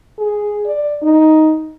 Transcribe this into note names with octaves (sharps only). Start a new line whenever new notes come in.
G#4
D5
D#4